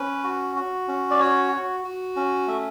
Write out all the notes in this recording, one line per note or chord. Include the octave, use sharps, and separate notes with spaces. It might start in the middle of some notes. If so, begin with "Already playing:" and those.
Already playing: C#4 B4
F#4
F#4
C#4
D5
F#4 C#5
F#4
F#4
C#4
A3 E5